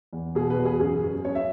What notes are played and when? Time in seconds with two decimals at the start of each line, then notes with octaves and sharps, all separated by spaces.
0.13 E2
0.35 B2 G#4
0.50 B4
0.58 E2
0.65 G#4
0.80 F#2 G#4
1.03 F#2
1.25 F#2 C#5
1.35 E5